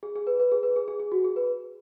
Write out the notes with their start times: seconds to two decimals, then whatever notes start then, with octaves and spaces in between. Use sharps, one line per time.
0.03 G#4
0.16 G#4
0.27 B4
0.40 B4
0.52 G#4
0.63 B4
0.76 G#4
0.88 G#4
1.00 G#4
1.12 F#4
1.24 G#4
1.36 B4